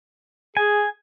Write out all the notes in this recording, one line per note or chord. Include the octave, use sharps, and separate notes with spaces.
G#4 G#5